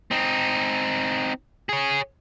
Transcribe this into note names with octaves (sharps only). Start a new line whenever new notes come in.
C4 D#4
G#4 C#5